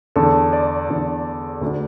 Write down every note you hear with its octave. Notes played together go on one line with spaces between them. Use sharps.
E2 D3 A4
D5
E2 D3
D2 D3